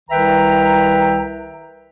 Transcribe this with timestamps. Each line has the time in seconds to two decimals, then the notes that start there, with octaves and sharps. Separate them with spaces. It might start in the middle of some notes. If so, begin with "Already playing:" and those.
0.10 C2 D#3 B4 E5 G5 A#5